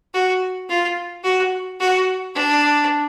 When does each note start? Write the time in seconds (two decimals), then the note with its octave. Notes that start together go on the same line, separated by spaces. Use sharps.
0.14 F#4
0.70 F4
1.24 F#4
1.80 F#4
2.35 D4